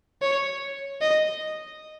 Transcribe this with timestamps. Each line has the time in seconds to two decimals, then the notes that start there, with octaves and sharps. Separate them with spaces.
0.22 C#5
1.01 D#5